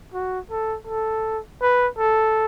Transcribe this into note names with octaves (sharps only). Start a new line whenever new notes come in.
F#4
A4
A4
B4
A4